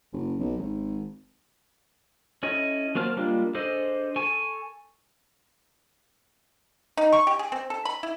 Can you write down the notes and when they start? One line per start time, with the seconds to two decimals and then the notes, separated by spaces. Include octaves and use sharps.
0.13 F#1
0.39 B1
0.57 G#1
2.43 C#4 E4 A4 D#5
2.95 F#3 A#3 C4 A5 F6
3.17 G3 G#3 A#3 D4 F4
3.55 D4 G#4 A4 C5 D#5
4.16 A4 G#5 A5 C#6
6.97 D#4
7.12 C#6
7.27 G4
7.39 G#4
7.52 C4
7.70 A4
7.85 B5
8.03 E4